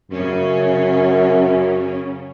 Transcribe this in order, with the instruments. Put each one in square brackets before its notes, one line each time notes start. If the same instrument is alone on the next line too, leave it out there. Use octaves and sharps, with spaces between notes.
[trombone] F#2 [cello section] C#3 C#4